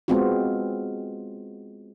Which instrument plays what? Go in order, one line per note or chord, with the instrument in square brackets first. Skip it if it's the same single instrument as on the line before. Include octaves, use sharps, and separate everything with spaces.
[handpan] G#3 B3 C4 F4 F#4